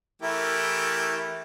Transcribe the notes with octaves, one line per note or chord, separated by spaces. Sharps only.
E3 A3 E4 G4 A#4